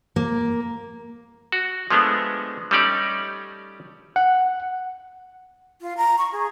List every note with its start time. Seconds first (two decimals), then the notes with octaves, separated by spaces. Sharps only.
0.16 A#3
1.52 F#4
1.90 F3 G#3 A3 B3 D4
2.71 G3 A3 C#4 D#4 G4 D5
4.16 F#5
5.81 F4
5.97 A#5
6.18 C#6
6.32 G#4